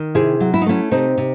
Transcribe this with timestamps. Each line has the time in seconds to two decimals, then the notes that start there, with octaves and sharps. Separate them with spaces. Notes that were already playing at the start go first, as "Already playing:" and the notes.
Already playing: D#3
0.15 C3 E4 G#4
0.40 F#3
0.54 E4
0.61 D#4
0.66 A3 C#4 E4
0.91 C3 C4 D#4
1.18 C3